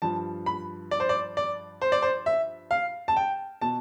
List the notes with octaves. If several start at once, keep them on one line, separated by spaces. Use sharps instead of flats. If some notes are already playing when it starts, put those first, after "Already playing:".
G2 F3 A5
B5
D5
C5
D5
D5
C5
D5
C5
E5
F5
A5
G5
B2 A5